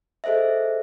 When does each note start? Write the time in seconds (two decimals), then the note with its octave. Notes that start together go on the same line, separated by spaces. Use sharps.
0.24 G#4 A4 C5 D#5 E5